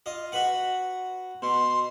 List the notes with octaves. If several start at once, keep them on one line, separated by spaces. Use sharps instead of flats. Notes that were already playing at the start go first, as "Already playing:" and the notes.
F4 D#5
F#4 B4 F#5
B2 C6